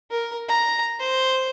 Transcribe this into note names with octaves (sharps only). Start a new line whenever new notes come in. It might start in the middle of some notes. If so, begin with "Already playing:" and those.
A#4
A#5
C5